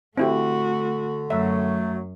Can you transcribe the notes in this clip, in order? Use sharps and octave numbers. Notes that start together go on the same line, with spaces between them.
D3 A3 C4 E4 F#4 G4
F#2 F#3 A3 E5